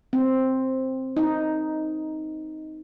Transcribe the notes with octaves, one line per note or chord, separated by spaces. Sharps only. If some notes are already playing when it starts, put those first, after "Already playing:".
C4
D#4